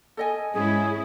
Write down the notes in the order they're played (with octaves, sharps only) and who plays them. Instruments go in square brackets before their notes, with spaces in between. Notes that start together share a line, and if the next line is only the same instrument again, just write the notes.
[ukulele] A4 D#5 G#5
[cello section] G#2 C#4 E4 [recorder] G#4